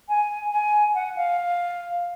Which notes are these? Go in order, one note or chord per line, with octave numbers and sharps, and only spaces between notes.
G#5
G#5
F#5
F5